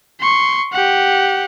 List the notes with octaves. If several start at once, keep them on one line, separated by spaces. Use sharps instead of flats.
C6 C#6
G4 F#5